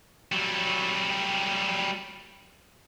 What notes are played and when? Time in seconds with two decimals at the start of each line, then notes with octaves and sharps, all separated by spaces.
0.32 F#3 G3